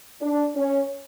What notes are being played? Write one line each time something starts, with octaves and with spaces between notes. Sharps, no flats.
D4
C#4